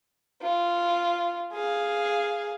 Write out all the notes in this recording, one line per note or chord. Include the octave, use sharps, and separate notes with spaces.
F4
G#4 F5